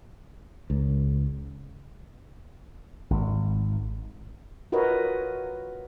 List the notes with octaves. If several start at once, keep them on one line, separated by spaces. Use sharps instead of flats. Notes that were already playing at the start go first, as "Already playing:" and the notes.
C#2
G#1
F4 F#4 A#4 B4 C#5 D#5